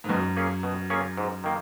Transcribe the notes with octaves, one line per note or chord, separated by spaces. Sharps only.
G#2
F#2 B2
A#3 C#4 G#4 C#5
B2
A#3 C#4 G#4 C#5
G#2
D#3 A#3